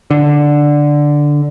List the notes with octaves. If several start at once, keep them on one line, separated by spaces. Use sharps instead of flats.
D3